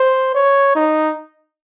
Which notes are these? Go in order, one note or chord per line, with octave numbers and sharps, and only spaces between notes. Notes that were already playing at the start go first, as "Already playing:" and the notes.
Already playing: C5
C#5
D#4